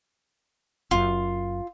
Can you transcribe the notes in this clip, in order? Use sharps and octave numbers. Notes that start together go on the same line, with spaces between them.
F#1 F#2 F4